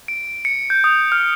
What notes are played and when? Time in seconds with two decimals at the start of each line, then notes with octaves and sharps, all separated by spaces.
0.08 D7
0.45 C#7
0.70 G6
0.84 D#6
1.12 F6